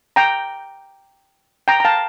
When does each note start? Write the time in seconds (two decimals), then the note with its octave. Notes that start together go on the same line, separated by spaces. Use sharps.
0.16 G5 A#5
1.68 G5 A#5
1.80 A#5
1.85 F5 A5